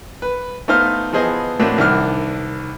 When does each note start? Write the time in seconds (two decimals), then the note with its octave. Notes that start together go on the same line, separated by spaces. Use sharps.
0.22 B4
0.68 A3 B3 D#4 C5 F5 F6
1.13 E3 F3 B3 G#4 C5 D#5
1.59 A2 A3 A#3 C4 D4 F#4
1.78 C2 D#3 E3 D4 F#5 F6